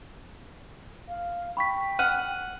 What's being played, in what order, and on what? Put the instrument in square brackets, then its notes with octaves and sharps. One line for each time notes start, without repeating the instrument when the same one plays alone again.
[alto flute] F5
[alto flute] G5 [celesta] B5 C#6 B6
[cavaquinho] F#5 [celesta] F6 D#7